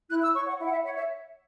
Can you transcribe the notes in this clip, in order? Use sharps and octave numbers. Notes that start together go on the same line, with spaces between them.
E4 F#6
E6
C#5 C#6
F#5
E4 E5
F#5
E5
C#5 F#5
E5